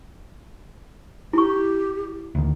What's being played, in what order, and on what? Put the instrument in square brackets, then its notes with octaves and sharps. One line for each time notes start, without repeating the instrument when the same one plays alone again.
[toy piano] E4 C#6 [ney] G4
[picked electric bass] D2 D#3